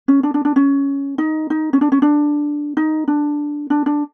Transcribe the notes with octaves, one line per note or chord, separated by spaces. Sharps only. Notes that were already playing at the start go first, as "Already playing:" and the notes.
C#4
D4
D4
D4
C#4
D#4
D#4
C#4
D4
C#4
D4
D#4
D4
D4
D4